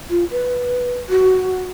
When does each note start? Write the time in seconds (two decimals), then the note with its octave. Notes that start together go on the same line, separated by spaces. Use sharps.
0.10 F4
0.31 B4
1.10 F#4